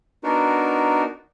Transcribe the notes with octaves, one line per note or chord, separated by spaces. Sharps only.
B3 D4 D#4 F#4 A#4